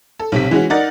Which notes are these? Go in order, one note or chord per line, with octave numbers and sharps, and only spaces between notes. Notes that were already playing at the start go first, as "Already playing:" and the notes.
A4
B1 C3 B6
E3 G#3 C#4 F#4
D#4 A#4 D5 F#5 A6